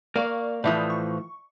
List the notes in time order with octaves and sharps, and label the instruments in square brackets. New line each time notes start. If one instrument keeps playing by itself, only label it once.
[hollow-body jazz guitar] A#3 [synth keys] D5 F5 C#6
[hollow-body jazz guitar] A2 E3 F3 [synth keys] D5 E5 D#6
[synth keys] C#6